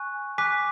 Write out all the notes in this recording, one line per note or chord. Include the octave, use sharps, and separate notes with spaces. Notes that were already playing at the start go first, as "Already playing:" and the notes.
Already playing: G#5 C#6 F#6
G#5 D6 F#6 B6